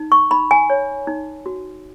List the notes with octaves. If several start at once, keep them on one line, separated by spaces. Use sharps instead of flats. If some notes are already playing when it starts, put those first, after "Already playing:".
Already playing: D#4
C#6
D#4 B5
G#5
C#5
D#4
F#4